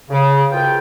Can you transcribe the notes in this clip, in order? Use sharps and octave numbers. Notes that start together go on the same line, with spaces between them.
C#3
C2 B2 F4 G#4 G5